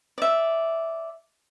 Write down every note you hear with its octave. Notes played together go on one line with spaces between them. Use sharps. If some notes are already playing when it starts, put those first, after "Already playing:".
D5 E5